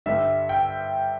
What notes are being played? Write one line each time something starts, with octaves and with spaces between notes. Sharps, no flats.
G2 D3 G3 E5
G5